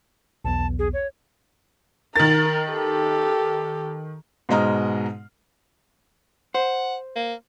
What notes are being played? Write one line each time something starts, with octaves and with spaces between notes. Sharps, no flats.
B1 E2 B3 A5
G#4
C#5
D#3 A#4 A6
G4 A4
G#2 B2 G#3 D#5 A#5 F6
C5 F#5
A#3